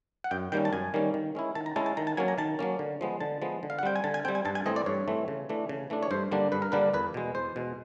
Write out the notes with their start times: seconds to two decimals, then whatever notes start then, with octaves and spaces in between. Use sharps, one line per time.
0.24 F#5
0.31 F#2 G5
0.52 D#3 G3 A#3 C#4 G5
0.65 A5
0.73 F#2 G#5
0.94 D#3 G3 A#3 C#4
1.14 D#3
1.35 G#3 C#4 E4
1.55 D#3 A5
1.66 A#5
1.76 G#3 C#4 E4 A5
1.86 A5
1.97 D#3 A#5
2.07 A5
2.17 F#3 A#3 C#4 G#5
2.28 A#5
2.38 D#3 A5
2.59 F#3 A#3 C#4
2.79 D3
3.01 F3 G#3 B3
3.20 D3 A5
3.42 F3 G#3 B3
3.63 D3
3.70 F5
3.79 F#5
3.83 G3 C4 G5
3.96 G#5
4.04 D3 A5
4.14 G#5
4.25 G3 C4 G5
4.35 G#5
4.45 G2 A5
4.55 G#5
4.66 E3 A3 C4 D#5
4.76 D5
4.86 G2 C#5
5.08 E3 A3 C4
5.28 C#3
5.49 E3 A3 D4
5.69 C#3
5.90 E3 A3 D4
6.03 C#5
6.11 G2 C5
6.32 D3 G3 A#3 D4
6.52 G2 B4
6.62 A#4
6.72 D3 G3 A#3 D4 B4
6.94 E2 B4
7.14 B2 G#3
7.35 E2 C5
7.56 B2 G#3